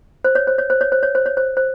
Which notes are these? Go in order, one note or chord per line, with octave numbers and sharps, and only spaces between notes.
C5
C#5
C5
C#5
C5
C#5
C5
C#5
C5
C#5
C5
C5